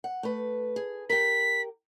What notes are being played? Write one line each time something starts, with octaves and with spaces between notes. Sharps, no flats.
F#5
A3 B4
G#4
G4 A#4 B6